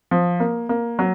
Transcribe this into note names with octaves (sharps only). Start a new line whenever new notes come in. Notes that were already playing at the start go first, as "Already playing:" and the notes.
F3
A#3
A#3
F#3